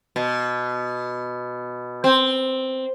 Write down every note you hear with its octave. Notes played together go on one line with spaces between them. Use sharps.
B2
C4